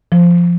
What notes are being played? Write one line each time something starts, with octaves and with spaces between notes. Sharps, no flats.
F3